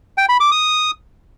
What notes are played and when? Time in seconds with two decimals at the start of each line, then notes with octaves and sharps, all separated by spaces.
0.18 G5
0.29 B5
0.40 D6
0.52 D#6